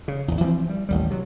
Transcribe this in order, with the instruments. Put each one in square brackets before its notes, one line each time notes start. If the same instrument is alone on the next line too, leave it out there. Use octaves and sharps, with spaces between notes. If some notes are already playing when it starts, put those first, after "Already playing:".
[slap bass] C#3
G#1 E2
E3 F3 A#3 C4
G3
A1 D#2 G3
C3 F#3